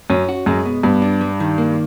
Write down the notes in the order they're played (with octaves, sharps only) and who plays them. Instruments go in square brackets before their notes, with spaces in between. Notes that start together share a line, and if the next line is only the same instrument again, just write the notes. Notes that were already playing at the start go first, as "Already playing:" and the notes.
[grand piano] F#2 [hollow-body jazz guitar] C#4
[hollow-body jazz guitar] F#4
[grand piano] F#2 [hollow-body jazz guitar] G#3
[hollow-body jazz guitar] B2
[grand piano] G2 [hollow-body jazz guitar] B3
[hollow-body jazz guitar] D4
G3
D#3
A#3